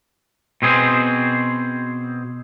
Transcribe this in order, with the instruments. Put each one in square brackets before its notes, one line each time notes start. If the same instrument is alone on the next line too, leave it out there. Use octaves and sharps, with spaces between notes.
[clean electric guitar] B2 C4 G#4 C5